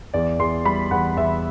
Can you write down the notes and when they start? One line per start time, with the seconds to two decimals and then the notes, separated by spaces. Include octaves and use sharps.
0.14 E2 D5
0.39 E2 C6
0.65 G3 B5
0.91 E2 F#5
1.17 E2 E5